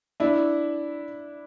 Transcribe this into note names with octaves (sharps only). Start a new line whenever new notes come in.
D4 E4